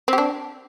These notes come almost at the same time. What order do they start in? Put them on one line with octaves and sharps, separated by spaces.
C4 G4 D4